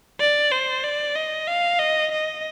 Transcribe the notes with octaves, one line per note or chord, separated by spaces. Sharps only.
D5
C5
D5
D#5
F5
D#5
D#5